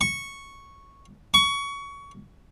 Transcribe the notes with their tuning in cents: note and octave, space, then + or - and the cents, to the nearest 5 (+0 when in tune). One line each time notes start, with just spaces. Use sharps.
C#6 -5
C#6 +20